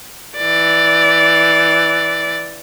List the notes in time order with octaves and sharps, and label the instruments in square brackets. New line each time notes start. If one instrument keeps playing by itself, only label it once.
[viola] E3 D5